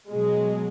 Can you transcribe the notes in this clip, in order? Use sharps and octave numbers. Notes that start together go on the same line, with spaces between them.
B2 F#3 G#3